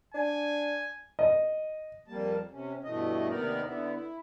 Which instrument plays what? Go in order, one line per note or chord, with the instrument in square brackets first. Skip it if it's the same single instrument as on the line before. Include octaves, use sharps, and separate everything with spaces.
[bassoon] D4 [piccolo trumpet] G#5
[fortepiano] D#5
[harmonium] F2 G3 A#3 A5
C3 C#4
G2 B2 E3 A3 D#5
D#2 C3 B3 D#4 A#4 D5
D3 B3 E4
E4